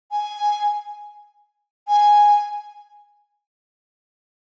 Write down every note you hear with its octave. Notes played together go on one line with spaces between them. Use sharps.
G#5
G#5